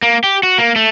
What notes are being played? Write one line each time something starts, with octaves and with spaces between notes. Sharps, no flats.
A#3
G4
F#4
A#3
A3